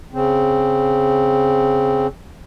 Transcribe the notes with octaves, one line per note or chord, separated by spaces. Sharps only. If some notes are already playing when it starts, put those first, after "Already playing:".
C#3 C4